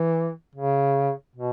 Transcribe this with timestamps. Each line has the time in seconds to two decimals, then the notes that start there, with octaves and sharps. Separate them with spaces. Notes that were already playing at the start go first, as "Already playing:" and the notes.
Already playing: E3
0.55 C#3
1.35 B2